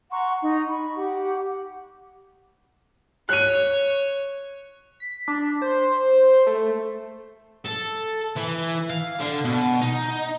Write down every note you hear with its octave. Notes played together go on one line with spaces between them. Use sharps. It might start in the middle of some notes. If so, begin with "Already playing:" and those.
F#5 A#5 C6 C#6
D#4
B5 C#6
G4 F#5
C#5 F#6 D#7
B6
D4
C5
A3
A4
E3
F5
D3
B2
D#4